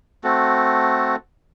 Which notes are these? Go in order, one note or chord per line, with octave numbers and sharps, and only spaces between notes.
A3 C4 F#4 A4